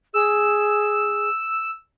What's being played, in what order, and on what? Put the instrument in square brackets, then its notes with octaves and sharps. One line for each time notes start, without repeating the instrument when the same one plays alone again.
[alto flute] G#4 [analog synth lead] E6